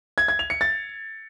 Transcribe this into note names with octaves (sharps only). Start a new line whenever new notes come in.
G#6
G#6
F7
C#7
A6